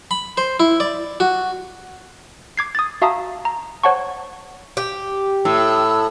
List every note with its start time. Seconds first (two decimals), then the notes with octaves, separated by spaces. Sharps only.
0.11 B5
0.37 C5
0.60 E4
0.80 D5
1.20 F#4
2.57 D6 G#6 C7
2.75 D#6 A6
3.02 F#4 E5 F5 A5 A#5 D#6
3.45 A#5
3.83 C5 C#5 F#5 A5 C#6
4.77 G4
5.45 A2 E6